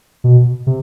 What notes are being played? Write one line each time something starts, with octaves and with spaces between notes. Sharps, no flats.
B2
C3